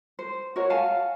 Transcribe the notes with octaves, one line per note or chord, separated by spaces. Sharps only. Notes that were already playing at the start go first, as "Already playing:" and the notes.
C5
F#4 A#4 C#5 F#5
F5 F#5 G#5 A5